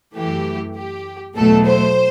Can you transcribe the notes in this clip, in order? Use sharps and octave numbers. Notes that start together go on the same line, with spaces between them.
F#2 E3 A3 G4
G4
E2 B2 F#3 A3 A4
C5